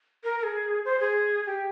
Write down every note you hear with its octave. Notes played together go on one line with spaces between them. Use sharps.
A#4
A#4
G#4
C5
G#4
G4